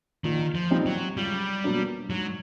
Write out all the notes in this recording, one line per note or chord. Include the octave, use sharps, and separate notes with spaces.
A#1 D#3
F3
A#2 G3 C4 D#4
F#3
C#2 G3
B2 F#3 A#3 D4
G#2 F#3